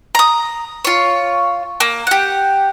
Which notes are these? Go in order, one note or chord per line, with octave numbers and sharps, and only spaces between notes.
A#5 D#6
F4 C#5
A#3
G4 F#5